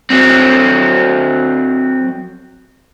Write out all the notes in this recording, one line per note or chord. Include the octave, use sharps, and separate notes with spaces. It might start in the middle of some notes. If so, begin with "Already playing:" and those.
F#3 C4